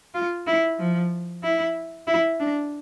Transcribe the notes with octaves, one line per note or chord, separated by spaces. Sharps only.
F4
E4
F3
E4
E4
D4